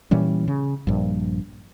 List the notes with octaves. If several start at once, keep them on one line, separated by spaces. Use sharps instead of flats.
A#2 E3 G3 C#4
C#3
A#1 G2